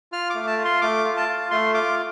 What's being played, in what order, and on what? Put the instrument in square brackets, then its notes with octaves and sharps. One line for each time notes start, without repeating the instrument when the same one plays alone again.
[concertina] F4 F6
A3 D6
A5
F4
C6
A3 D6
F4
A5
F4
A3 C6
F4 D6